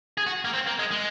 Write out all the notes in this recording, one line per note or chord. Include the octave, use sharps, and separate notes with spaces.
G#4
F#4
A#3
C4
A#3
G#3
G#3